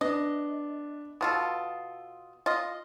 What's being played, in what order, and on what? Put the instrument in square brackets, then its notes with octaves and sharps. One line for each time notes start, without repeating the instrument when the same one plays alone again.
[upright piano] B3 D4 [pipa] D#5
[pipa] B2 F4 A4 [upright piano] D#6
[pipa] F4 D#5